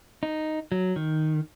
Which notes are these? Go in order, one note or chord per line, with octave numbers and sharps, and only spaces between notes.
D#4
F#3
D#3